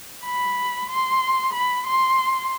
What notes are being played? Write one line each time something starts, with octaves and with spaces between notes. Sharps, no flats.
B5
C6
B5
C6